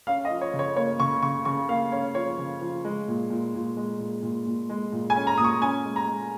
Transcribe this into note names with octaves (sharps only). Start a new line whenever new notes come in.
C#4 F5
D#5
F3
C#5
C#3
C#5
A#3 C#5
C#3 C#6
C#3 C#6
C#3 C#6
A#3 F5
C#4 C#5
F3 C#5
C#3
F3
G#3
A#2
A#2
A#2
G#3
A#2
A#2
A#2
G#3
A#2
G#5
C#4
A#5
A#2 D#6
C#6
C#4 G#5
G#3
A#5
G#3